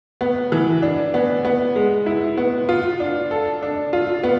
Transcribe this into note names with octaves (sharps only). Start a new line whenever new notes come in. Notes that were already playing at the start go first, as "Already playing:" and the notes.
B3
E3
D4
B3
B3
G#3
E4
B3
F4
D4
A4
D4
F4
B3